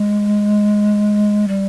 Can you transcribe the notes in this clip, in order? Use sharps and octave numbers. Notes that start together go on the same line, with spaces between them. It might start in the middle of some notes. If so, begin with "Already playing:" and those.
Already playing: G#3
G3